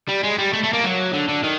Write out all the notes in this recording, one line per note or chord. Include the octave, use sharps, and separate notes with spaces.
G3
G#3
G3
A3
A3
A#3
F#3
D3
D3
D#3